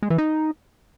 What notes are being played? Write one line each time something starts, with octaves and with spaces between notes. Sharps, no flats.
G#3
E3
D#4